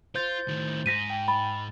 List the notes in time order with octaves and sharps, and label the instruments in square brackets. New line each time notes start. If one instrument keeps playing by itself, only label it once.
[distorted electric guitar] F4 [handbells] C5 G6 A6
[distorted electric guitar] A2 D#3
[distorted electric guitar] G#2 [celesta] A#6 B6 D#7
[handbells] G5
[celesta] B5 [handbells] A6